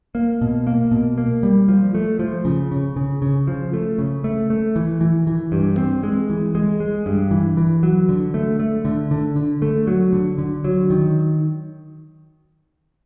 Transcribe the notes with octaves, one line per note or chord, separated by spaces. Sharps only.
A#3
B2
A#3
B2
A#3
G3
F3
A3
F3
C#3
C#3
C#3
C#3
F3
A3
C#3
A3
A3
E3
E3
E3
G2
C4
G#3
E3
G#3
G#3
G2
E3
E3
F#3
D3
A3
A3
D3
D3
D3
A3
F#3
D3
D3
F#3
D#3